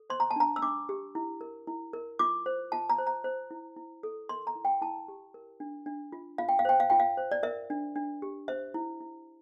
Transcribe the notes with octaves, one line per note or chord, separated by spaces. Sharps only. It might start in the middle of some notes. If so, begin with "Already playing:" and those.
Already playing: A4
C5 C6
A#5
A5
D4 A#5
E6
D4 D6
G4
E4
A#4
E4
A#4
F4 D6
C5
F4 A5
A#5
C5
A#5
C5
E4
E4
A4
A#4 C6
A#5
E4
G5
E4 A5
G4
A#4
D4
D4
F4
F4 F5
G5
F5
C5 G5
F5
F4 G5
F5
C5
D5
A#4 E5
D4
D4
G4
C5 E5
E4
E4